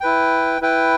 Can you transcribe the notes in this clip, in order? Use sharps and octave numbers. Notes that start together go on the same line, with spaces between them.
E4 B4 G5
E4 B4 G5